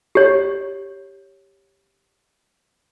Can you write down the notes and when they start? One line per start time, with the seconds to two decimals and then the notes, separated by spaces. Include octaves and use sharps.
0.15 G4 C#5